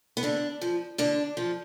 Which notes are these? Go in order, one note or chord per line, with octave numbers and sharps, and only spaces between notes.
B3
D3 D4
F3
D3 D4
F3